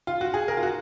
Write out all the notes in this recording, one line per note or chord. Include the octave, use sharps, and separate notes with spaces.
F4
F#4
G#4
A#4
F4
F#4